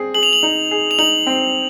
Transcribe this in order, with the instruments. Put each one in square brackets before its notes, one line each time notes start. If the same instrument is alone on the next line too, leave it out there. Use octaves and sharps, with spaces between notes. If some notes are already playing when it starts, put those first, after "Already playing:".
Already playing: [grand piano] C4 G#4
[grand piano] G#4 [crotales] F#7
[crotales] F7
F#7
[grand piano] D#4
G#4
[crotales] F7
[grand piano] D#4 [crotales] F#7
[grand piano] C4